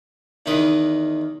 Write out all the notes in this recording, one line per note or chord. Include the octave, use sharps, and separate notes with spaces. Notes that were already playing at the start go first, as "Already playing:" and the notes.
E2 D#3 B4 D#5